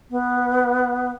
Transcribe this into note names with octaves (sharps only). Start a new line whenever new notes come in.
B3